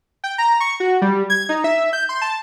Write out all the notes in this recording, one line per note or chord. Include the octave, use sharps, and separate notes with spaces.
G5
A#5
C#6
F#4
G3
G#6
D#4
E5
G6
C6
A5